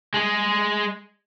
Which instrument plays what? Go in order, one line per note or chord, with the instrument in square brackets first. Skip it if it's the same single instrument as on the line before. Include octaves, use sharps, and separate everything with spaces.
[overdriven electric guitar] G#3 G#4